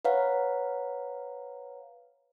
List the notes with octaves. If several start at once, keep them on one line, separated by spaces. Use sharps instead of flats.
B4 C#5 F5 F#5 A#5